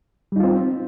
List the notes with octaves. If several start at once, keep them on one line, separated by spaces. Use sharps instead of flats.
G3 C4 D#4 F4